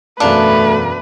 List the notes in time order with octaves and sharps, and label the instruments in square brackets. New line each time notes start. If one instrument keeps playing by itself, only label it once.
[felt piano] E1 F#2 F5 [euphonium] A3 [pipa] D4 [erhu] B4